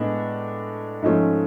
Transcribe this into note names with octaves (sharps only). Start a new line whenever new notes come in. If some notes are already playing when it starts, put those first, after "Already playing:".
Already playing: A2 G#3 B3 D4
G#2 F3 A3 C#4